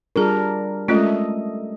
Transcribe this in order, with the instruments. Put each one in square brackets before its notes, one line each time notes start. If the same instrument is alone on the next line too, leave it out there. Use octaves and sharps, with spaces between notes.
[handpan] G3 D4 A#4 [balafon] F4 G#4
[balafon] G#3 C#4 F4 [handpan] A3 D#5